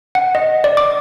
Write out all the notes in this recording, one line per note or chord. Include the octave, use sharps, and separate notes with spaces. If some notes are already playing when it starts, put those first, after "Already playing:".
F#5
D#5
D5
D6